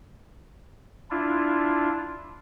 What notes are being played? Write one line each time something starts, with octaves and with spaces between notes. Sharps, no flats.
D4 E4 F4